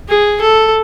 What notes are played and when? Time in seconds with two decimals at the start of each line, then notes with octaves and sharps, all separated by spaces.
0.09 G#4
0.41 A4